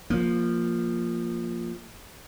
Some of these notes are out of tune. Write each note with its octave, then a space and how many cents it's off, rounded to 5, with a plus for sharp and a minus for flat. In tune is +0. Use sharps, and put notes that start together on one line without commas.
F3 +0 A#3 +0